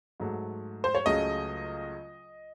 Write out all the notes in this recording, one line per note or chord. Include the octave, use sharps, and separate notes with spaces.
G#2 F#3 A3
C5
C#5
C#2 C#3 F#3 A3 D#5